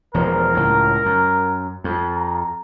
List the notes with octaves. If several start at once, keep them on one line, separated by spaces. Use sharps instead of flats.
E1 F3 A#4
C#2 A2
F#2
F2
A#5